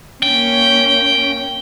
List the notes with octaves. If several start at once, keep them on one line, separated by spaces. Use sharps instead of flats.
A#3 C#4 G5